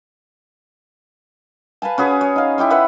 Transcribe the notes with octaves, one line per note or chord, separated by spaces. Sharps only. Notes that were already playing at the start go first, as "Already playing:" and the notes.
B4 F5 G#5 A5
C#4 F#4 G#4 B4
C#5
D#4 F5
E4 G4 C6 C#6
B4 C#5 E5 F#5